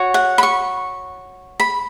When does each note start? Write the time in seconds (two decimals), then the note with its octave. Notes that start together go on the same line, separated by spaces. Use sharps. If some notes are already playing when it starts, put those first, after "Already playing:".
Already playing: F#4 C#5
0.14 F#5
0.38 B5
0.43 C#6
1.60 B5